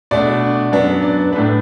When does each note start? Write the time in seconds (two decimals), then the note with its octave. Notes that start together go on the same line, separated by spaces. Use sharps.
0.11 B2 A3 D4 D5
0.72 F#2 F#3 B3 D4
1.03 D5
1.32 A2 A3 D4 B4